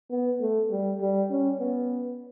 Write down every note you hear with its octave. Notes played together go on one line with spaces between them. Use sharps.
B3
A3
G3
G3
C#4
B3